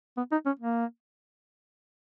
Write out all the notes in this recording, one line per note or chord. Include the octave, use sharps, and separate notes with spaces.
B3
D#4
C#4
A#3